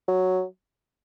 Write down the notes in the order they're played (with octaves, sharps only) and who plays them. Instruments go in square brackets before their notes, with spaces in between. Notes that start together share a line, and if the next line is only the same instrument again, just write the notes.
[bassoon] F#3